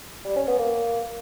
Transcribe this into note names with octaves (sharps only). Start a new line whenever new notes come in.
G3
C#4
B3
A#3